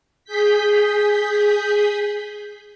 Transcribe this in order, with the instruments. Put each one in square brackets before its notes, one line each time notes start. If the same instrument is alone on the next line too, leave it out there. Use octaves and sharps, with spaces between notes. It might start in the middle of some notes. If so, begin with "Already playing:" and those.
[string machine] G#4 G6 B6